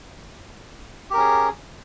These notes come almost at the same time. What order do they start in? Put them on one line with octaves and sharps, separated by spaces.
G4 A#4 C#4 G#4